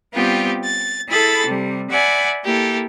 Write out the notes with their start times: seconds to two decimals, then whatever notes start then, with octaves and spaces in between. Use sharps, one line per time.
0.14 G3 B3 C4 F4 G4
0.63 A6
1.10 E4 G#4 A4 B5 A6
1.46 C3 G3
1.91 D5 E5 F#5 G#5 B5
2.45 A#3 E4 G4 A4